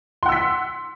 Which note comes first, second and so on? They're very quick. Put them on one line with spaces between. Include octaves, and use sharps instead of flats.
C6 F#5 E6 B6